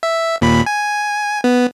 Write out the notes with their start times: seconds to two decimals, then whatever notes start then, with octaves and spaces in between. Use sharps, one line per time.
0.03 E5
0.41 D#2 A#2 B5
0.66 G#5
1.44 B3